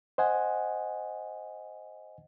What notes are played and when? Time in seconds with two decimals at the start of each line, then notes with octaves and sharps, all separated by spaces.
0.18 C5 D#5 F#5 G#5